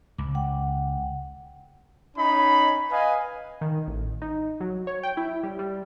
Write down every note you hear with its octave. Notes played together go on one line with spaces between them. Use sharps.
C#2 D6
F#5 G5
C#4 D#4 B5
B4 D#5 F5 G#5
D#3
A1
D#4
F#3
C#5
G5
E4
G3
G3